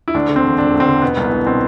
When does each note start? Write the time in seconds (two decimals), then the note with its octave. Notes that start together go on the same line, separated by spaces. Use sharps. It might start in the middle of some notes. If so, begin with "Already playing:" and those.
0.08 E4
0.14 D2 D4
0.29 D3
0.36 C4
0.44 E1
0.58 E1 D4
0.74 D2
0.80 C4
0.88 D3
1.02 B2 B3
1.17 C2
1.24 B3
1.32 C2
1.46 B2 C4